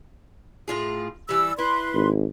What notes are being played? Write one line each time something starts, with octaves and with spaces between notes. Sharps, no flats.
A2 F4 G#4
E3 G3 E6
E4 B4 C6
G#1